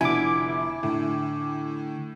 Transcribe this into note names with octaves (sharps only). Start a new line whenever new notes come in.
F1 D3 B3 E4 G#5 D6
A2 D3